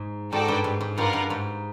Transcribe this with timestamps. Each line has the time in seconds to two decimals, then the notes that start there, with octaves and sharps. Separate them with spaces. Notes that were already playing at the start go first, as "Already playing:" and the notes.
Already playing: G#2
0.32 G#2 F#4 A4 D5 G5
0.48 G2
0.64 G#2
0.81 G#2
0.97 G2 F4 A#4 D5 F#5
1.13 G2
1.30 G#2